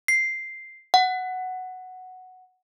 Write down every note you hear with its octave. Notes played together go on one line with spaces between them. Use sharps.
C7
F#5